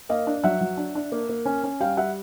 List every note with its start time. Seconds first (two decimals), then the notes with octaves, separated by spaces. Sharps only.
0.09 A#3 D#5 F5
0.27 D4
0.44 F#3 E5 F#5
0.61 F#3
0.77 D4
0.95 D4
1.12 A#3
1.29 A#3
1.45 C#4
1.63 C#4
1.80 G3 F5 G5
1.97 G3 E5 F#5